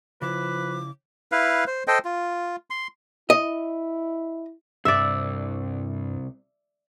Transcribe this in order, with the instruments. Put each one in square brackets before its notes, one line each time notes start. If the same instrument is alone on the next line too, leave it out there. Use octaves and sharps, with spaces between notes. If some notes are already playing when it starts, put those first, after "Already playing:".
[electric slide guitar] C#3 E4 [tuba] F3 [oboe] B4 [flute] D6
[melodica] E4 B4 F5
C5
A4 C5 D#5 G5
F4
C6
[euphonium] E4 [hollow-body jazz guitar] D#5
[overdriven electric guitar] C2 [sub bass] G2 [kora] D5 E5